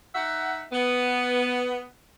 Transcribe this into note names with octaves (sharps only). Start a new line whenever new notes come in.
D#4 E5 F#5
B3